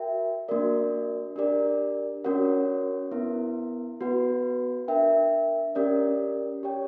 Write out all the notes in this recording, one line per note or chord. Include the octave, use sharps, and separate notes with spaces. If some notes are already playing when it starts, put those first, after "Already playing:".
Already playing: F#4 A#4 E5 G5
A#3 D4 F#4 A#4 D5
D4 G4 A#4 D5
C#4 F#4 A#4 C#5 F#5
B3 E4 A#4
B3 F#4 B4 F#5
D4 A#4 E5 G5
C#4 G4 A#4 D5
G4 C#5 G5